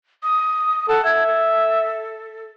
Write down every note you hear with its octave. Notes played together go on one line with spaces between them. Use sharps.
D#6
A4 F#5
E5 G#6
A4